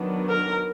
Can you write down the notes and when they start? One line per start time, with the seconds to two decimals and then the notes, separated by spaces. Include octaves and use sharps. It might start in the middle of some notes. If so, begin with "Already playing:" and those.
Already playing: D#3 F#3 B3 D4
0.28 A#4